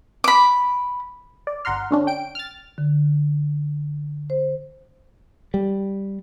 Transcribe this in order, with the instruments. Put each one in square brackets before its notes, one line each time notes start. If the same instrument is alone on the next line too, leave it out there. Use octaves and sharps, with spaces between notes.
[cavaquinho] B5 D6
[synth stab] D5
G1 F#5 A#5 C6 F6
D3 C#4 D4
G5 D7
F6 A6
[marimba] D3
C5
[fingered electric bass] G3